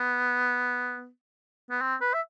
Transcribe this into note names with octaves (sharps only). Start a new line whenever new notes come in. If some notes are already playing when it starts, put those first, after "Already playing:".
Already playing: B3
B3
C4
B4
E5